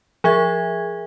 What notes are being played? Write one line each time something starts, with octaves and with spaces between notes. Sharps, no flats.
F3 G#4 E5 G#6